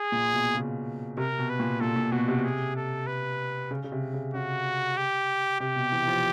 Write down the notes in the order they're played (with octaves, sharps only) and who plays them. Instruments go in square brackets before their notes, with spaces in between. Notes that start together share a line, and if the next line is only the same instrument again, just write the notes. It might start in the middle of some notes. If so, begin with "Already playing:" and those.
Already playing: [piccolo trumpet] G#4
[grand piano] A#2
B2
C#3
[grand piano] C3 [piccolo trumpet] A#4
[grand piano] B2
[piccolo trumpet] B4
[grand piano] A#2
[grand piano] A#2 [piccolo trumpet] A4
[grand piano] A#2
[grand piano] B2 [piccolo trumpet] F#4
[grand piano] C3
[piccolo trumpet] G#4
A4
B4
[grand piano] C#3
C#3
C3
C#3
[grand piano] C#3 [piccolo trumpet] F#4
[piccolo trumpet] G4
[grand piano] C3 [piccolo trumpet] G4
[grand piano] B2
E3
F3